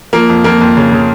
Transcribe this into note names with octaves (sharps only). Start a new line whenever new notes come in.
F3 A#3
F2
F2 A#3
F2
C#3
C#3